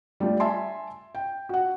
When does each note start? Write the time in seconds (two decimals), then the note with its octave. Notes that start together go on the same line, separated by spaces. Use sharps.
0.20 G3 A3 D4 F4
0.40 E5 G#5 A5 C6
1.15 G5
1.49 F#4 F#5